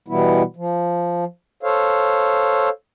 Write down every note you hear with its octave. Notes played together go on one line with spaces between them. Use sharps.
B2 E3 G3 B3 E4
F3
A4 C5 C#5 F5